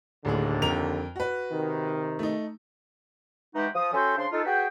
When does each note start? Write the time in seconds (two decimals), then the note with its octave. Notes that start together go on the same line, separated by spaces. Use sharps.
0.25 D1 D#2 A2 D3 G#4
0.62 F2 A#4 F7
1.16 F#4 B4
1.52 C3 D#3
2.19 A3 D#4
3.55 E3 G#3 D#4 F#4 G4 B4
3.75 F3 D#6
3.94 C#4 F#4 A4 E5 G5 C6
4.18 C#3 D4 C5 C6
4.32 D#4 F4 A4
4.45 F#4 G#4 B4 G5